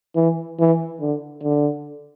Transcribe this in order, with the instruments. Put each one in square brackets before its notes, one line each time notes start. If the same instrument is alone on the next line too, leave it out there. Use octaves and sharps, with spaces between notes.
[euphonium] E3
E3
D3
D3